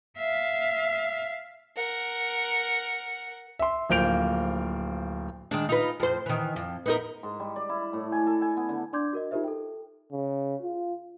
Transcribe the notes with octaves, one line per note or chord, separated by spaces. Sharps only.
E5 F5
A#4 F#5
E5 C6
D1 F3 A#3 G6 D7 F7
D#3 G#3 D4
D#4 F4 B4
F2 C5
D#3 E3
F2
B3 D#4 A#4
G#2
G3
D5
E4
A2
G#5
A4
G#5
B3
D3
D4 D5 C6 D6 G6 G#6
F#4 A#4 D#5
D#4 F4 G4 A#4 C5 E5
A4 G5
C#3
F4